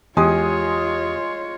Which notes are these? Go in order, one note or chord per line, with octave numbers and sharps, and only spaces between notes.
E2 G#3 F4 G4 C#5 G#5 D#6